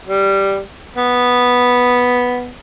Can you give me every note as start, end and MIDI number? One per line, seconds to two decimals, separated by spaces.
0.06 0.63 55
0.96 2.51 59